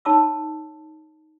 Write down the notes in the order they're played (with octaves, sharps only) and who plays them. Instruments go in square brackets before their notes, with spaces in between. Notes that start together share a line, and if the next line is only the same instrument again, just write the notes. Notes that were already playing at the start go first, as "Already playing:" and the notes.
[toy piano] D#4 C#5 A5 B5 D6 E6